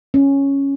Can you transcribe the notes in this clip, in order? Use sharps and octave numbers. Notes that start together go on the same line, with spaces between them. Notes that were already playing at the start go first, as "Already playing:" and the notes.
C#4